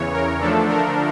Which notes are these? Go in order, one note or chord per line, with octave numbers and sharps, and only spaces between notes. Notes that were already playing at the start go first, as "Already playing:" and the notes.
Already playing: E2 C#3 E3 C#5
A#4
D3 F3 A3 D4 A4
A#4